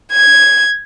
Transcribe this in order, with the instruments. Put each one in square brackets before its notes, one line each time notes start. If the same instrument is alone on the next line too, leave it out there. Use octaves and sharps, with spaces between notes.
[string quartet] G#6